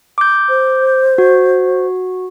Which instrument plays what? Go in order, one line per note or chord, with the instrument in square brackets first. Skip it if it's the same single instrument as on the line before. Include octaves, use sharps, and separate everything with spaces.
[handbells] D6 G6
[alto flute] C5
[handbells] F#4